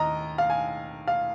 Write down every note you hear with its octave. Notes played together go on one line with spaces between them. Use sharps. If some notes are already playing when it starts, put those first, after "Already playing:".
Already playing: D#2 D#5 A#5
F5
G#5
F5